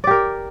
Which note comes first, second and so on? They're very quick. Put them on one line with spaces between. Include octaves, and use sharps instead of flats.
D5 G4 A#4